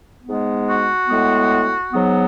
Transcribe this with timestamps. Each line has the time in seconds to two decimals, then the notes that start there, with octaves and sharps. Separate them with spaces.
0.24 G#2 G#3 B3
0.66 F#4
1.08 A2 G#3 B3
1.93 G#2 F#3 B3